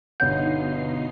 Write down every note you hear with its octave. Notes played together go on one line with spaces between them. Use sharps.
G1 B2 D#4 C#5 F#5 G6 C7